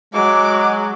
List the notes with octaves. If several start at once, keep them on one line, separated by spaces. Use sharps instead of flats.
F#3 G#3 D6